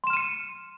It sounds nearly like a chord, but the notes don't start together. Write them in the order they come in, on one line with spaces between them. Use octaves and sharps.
C6 E7 F6 D#7 C#7